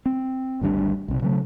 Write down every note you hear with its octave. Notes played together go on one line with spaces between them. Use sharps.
C4
G#1 D2 G3 D4
B1 C3
C#3 F#3 A3